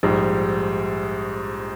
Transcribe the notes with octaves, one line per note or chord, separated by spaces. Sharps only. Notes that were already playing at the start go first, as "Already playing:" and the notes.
A#1 G#2 G3